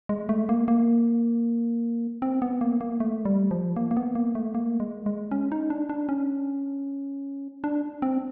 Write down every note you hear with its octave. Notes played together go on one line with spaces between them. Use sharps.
G#3
A3
A#3
A#3
C4
B3
A#3
A#3
A3
G3
F3
A#3
A#3
B3
A#3
A3
A#3
G#3
G#3
C#4
D#4
D4
D4
C#4
D4
C4